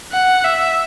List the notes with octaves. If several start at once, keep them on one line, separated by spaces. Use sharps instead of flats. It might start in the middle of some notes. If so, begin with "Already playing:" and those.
F#5
E5